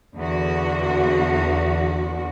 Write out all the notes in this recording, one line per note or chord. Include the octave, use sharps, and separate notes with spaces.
E2 D3 F#4